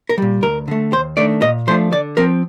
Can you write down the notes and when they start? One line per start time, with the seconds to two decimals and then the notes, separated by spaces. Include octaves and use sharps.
0.09 A#4
0.18 A#2 G3
0.42 D2 A#4
0.68 D3 A3
0.93 D#2 C5
1.17 D#3 A3 D4 D5
1.42 A#2 D#5
1.67 F3 A3 D4 F4 C5
1.92 D3 D5
2.17 F3 C4 A#4